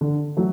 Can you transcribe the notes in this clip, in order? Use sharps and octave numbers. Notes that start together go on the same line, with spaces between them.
D3
F#3 A3